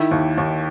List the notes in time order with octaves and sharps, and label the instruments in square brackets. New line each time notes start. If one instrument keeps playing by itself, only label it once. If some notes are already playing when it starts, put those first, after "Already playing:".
Already playing: [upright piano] D#3 E4
D#2
D#2